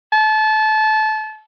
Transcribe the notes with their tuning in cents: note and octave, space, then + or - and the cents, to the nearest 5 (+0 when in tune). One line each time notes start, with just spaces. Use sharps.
A5 -25